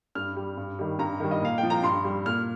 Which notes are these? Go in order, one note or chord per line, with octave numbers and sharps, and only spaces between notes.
G2 F6
G3
G2
D#3 G3
G2 A#5
D#3 G3
D#5
A#2 F5
G5
F3
A#5
G2 C6
G3
A#2 F6